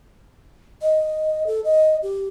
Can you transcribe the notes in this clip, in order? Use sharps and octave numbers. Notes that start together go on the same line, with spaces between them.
D#5
A4
D#5
G4